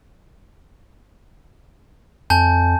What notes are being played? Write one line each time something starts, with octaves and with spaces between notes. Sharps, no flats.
F2 G#5 A5 G6